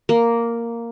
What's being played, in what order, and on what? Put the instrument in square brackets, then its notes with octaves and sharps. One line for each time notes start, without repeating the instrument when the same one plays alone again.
[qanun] A#3